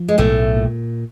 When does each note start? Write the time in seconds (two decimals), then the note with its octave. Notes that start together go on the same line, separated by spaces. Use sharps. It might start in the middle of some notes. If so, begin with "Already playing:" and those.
Already playing: F3
0.08 G#3
0.18 B1 A2 A3
0.56 A#2